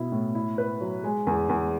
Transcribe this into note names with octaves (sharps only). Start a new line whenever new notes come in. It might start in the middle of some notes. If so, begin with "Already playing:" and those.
Already playing: B2 B3 E4
A2
E4
B4
F#3
G#3
E2
E2